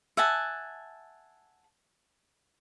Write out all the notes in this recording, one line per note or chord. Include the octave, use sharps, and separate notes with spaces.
E5 F#5 G#5 A5